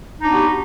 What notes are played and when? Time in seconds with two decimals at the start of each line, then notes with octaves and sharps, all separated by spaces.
0.20 D#4
0.23 D4
0.27 B3
0.30 F#4
0.34 G4